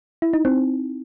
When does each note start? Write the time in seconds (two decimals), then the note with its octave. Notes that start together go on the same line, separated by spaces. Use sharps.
0.22 E4
0.33 D#4
0.45 C4